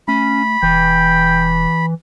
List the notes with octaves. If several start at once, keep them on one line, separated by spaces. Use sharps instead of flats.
A3 C#4 B5
E1 E3 G5